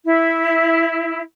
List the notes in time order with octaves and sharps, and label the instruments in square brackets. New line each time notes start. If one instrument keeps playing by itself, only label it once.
[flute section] E4